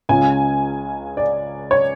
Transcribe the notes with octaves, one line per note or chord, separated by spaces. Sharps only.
C#2 C#3 G#3 C#4 F4 G#5
D5
C#5